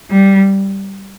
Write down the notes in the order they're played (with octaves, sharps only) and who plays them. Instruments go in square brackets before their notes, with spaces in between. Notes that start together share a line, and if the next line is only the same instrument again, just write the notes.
[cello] G3